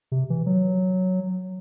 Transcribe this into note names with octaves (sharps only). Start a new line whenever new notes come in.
C3
E3
F#3